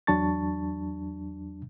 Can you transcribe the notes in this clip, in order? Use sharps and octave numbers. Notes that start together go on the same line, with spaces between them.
E2 F#3 D4 A5 C#6 A6